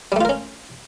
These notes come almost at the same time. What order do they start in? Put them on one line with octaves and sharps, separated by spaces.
G3 A3 F4 A#4 C#4